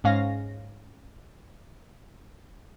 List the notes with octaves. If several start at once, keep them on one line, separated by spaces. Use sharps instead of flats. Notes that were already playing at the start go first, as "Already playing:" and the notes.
G#2 C#4 F5 A#6